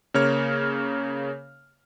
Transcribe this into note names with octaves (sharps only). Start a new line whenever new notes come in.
C#3 A#3 C#5 F6